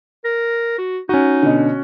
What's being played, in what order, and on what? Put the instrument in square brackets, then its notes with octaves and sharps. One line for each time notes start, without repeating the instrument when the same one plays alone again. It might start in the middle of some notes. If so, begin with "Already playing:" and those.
[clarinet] A#4
F#4
[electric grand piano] C#4 F#4 [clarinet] D#4
[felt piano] B2 D3